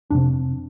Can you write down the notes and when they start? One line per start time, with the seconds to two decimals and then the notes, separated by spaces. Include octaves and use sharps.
0.10 F2 C3 D4